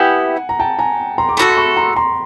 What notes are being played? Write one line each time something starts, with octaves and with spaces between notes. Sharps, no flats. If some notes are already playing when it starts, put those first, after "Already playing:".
Already playing: B3 E4 G4 F#5 G#5
A#5
G5 A5
G#5 A#5
A#5 C6
D6
A3 D4 F#4 A4 B5 C#6
C6
B5 C#6
A#5 C6
A#5 C6